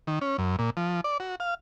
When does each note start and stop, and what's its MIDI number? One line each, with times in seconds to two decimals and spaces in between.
0.07 0.19 51
0.21 0.37 61
0.38 0.56 42
0.59 0.70 46
0.77 1.01 53
1.04 1.18 74
1.20 1.35 66
1.40 1.54 77